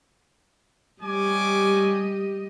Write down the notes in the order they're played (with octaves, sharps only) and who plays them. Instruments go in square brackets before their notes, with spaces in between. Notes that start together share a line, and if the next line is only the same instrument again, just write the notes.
[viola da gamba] G3 G4 D#5 [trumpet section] C#4 G#5 D6